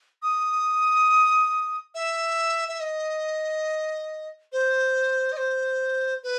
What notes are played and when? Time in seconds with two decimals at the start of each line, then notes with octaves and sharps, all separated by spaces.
0.22 D#6
1.94 E5
2.69 E5
2.80 D#5
4.52 C5
5.32 D#5
5.37 C5
6.23 B4